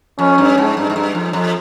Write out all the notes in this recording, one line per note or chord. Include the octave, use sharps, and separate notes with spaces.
F2 C#4
G2
G#2
G2
G#2
G2
F2
F2